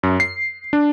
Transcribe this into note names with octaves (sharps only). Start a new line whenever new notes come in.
F#2
C7
D4